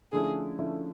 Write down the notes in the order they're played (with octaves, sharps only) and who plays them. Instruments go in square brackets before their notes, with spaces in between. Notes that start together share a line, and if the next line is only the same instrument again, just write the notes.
[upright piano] D3 F3 A3 C#4 E4 [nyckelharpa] G#4
[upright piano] D3 F3 A3 C#4 E4